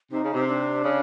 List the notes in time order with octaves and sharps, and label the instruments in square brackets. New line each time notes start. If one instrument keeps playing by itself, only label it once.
[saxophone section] C3 [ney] D#4
[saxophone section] C#3
C3
[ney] D4
[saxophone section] C#3